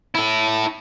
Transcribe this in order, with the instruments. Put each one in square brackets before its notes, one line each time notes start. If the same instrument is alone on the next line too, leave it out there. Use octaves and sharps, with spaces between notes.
[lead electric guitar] E4 A4